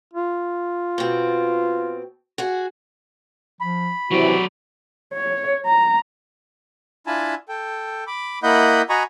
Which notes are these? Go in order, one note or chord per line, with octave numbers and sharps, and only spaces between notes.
F4
B2 C4
F#4 G#4 F#5
F3 B5
C3 E3 F#3 F#4 D5
C#5
A#5
D4 E4 F4 G#5 A5 B5
A4 G5
B5 D6
A#3 E4 D#5 F#5 B5 G6
F#4 D#5 G#5 A#5 B5 C#6